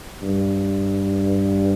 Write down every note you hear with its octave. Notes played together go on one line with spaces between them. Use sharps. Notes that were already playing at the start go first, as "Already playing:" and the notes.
G2